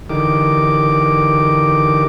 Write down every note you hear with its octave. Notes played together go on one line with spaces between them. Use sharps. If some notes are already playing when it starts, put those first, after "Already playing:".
D3 E3 D#4 G4 A#4 D6